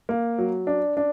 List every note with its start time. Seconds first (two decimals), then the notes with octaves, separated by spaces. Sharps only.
0.09 A#3
0.38 F#3
0.67 D4
0.97 D4